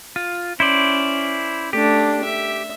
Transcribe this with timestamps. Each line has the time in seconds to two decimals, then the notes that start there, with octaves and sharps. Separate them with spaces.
0.16 F4
0.60 C#4 E4 C5 D5
1.73 A3 D4 G4
2.24 E5